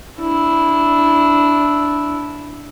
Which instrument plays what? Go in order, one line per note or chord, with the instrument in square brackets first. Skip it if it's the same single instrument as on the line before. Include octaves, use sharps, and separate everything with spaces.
[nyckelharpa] D4 E4